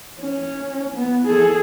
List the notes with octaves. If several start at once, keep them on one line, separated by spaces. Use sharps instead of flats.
C#4
B3
G#4 A4